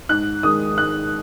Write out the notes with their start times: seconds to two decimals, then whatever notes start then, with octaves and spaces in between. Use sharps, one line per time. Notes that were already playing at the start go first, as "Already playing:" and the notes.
0.09 G#2 F#6
0.43 D#3 G#3 D#6
0.77 G#2 F#6